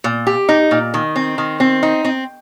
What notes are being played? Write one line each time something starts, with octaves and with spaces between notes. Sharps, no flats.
A#2
G4
D#4
A#2
D#3
C4
D#3
C4
D#4
C4